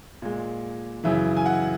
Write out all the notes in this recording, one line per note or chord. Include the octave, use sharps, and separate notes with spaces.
A#2 G#3
F#2 C#3 E3 E5
G#5
F#5